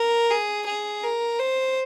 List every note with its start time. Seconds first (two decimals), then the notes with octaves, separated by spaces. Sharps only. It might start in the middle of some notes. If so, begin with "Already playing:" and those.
Already playing: A#4
0.30 G#4
0.67 G#4
1.03 A#4
1.39 C5